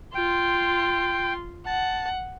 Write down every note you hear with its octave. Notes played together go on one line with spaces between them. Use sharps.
F4 G5 C6
F#5 A5